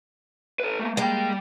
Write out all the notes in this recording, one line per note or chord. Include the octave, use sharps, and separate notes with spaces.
A4 B4
A3 A#3
G3 G#3 A#3 G5